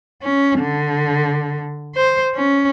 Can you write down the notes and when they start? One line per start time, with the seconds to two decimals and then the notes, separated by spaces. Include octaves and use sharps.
0.22 C#4
0.59 D3
1.95 C5
2.35 C#4